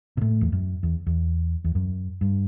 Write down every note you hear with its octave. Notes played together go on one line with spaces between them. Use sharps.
B2
A2
E2
F#2
E2
E2
E2
F#2
G2